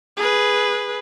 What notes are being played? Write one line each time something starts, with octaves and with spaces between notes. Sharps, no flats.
G#4 B4